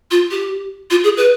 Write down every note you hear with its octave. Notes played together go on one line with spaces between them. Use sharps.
F4
G4
F4
G#4
B4